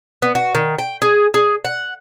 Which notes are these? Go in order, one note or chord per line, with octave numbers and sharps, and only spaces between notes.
B3
F#4
D#3
G5
G#4
G#4
F#5